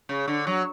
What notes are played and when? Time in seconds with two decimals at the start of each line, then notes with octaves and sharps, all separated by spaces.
0.09 C#3
0.28 D3
0.47 F#3